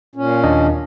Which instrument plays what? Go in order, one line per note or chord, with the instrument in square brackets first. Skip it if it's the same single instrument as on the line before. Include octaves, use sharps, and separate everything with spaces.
[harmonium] A#2 C#4
[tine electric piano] D#2 D4 D#5